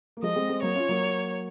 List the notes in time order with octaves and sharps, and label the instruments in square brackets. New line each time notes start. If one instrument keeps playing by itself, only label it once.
[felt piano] A#3
[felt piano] F3 G#3 [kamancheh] D#5
[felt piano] G#3 C4
G#3 C4
[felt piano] F#3 A#3 [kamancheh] C#5
[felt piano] C#4 F4
F#3 A#3